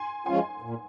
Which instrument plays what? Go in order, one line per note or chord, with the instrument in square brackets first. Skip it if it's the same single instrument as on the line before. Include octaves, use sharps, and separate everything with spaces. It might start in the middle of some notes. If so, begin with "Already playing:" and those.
Already playing: [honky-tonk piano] G#5 C6
[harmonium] F3 G#3 C#4 F4 [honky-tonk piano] G#5 C6
[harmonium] A#2